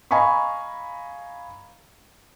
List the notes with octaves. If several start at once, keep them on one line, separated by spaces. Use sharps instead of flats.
D#5 F5 G#5 A#5 B5 C#6